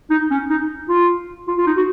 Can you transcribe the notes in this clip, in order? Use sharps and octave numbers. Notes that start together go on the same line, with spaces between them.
D#4
C#4
D#4
F4
F4
F4
D#4
F#4